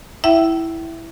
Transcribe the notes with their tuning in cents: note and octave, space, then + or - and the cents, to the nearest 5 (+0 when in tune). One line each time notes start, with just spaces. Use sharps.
E4 -5 E5 +10 G5 -35